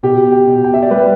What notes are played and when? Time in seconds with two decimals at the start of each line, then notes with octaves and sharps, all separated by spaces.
0.03 B2 G4
0.32 G5
0.47 B2
0.64 G5
0.74 E5
0.82 D5
0.90 G3 B4